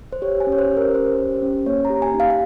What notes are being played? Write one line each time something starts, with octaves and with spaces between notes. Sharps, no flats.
C5
G4 C#5
G#5
C#4
C#5
C5
G4
A#4
C#4 C5
G4
C#4
A#3 C#5
A#5
G4
G#5
D#4
F5
F5